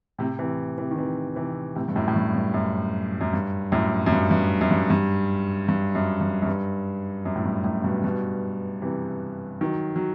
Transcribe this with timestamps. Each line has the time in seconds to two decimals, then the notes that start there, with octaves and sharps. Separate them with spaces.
0.18 A2 C3
0.39 C3 E3
0.78 C3 E3
0.91 D#3
0.97 C3 E3
1.36 C3 E3
1.75 A2 C3
1.88 G2
1.96 F#2 A2
2.08 A2
2.16 G2
2.34 G2
2.54 F#2
3.21 F#2
3.33 G2
3.72 F#2 A2
4.06 F#2
4.12 G2
4.31 G2
4.61 F#2
4.71 G2
4.90 G2
5.68 G2
5.95 F#2
6.21 G2
6.42 F#2
6.47 G2
7.25 F#2
7.36 A2
7.45 G2
7.64 F#2 A2
7.84 G2 B2
8.04 G2 B2
8.82 C3 E3
9.61 D#3 F#3
9.96 F#3